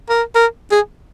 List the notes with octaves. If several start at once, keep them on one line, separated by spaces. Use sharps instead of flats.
A#4
A#4
G#4